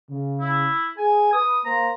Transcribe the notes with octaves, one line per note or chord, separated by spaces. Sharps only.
C#3
E4
G#4 G#5
B4 D#6
A#3 C5 A#5